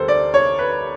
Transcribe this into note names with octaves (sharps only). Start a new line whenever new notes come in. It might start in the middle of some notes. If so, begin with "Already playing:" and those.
Already playing: D2 G3 A4 A#4 C5
D5
C#5
B4